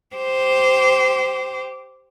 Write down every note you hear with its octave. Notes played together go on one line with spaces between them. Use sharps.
G4 C5